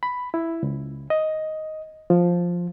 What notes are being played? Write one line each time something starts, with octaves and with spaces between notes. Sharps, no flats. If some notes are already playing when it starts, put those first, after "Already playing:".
B5
E4
C#2
D#5
F3